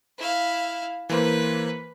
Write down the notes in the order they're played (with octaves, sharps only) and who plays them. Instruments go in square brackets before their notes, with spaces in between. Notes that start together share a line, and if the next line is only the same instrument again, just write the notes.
[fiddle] E4 F5
[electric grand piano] E3 A#3 C5 [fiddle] B4